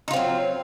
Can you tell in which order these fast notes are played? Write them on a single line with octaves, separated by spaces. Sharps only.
D#4 F4 C4 F#3